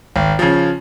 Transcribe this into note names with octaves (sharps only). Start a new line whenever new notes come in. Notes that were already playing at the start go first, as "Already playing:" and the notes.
G#1
C#3 F3